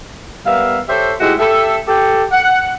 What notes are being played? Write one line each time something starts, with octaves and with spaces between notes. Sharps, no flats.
G3 B3 A#4 E5 F5
G4 A4 C5 C#5 E5
G#2 G#3 A3 E4 F#4 G4
G4 A4 E5
G4 A4
F#5